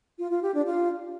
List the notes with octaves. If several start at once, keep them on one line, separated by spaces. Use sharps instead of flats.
F4
F4
G4
D4
F4